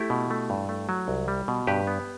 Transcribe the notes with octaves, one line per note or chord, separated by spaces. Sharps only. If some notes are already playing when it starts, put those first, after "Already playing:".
Already playing: A3 E4 G4
B2
A3
G2
A3
F#3
C2
G3
B2
G2 G4 B4
B3